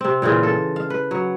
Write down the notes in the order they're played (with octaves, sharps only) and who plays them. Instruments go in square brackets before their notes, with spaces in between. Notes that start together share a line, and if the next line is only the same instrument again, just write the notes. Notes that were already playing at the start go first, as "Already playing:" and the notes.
[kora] C3 C4
A#2 C#3 E3 F4
A4
F5
B4
F#3